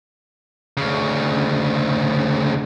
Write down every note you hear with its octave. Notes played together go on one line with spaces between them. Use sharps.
D2 C#3